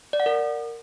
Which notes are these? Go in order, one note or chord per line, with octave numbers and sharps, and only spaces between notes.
D5
F#5
A#4